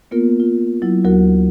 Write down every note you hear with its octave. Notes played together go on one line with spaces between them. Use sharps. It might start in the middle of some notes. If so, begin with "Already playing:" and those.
A#3 B3 F4 A#4
F4
F#3 E4
D2 F#3 F#4 A#4